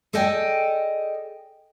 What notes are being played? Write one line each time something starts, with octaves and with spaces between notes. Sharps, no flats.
G#4 A4 D5 D#5 G5 G#5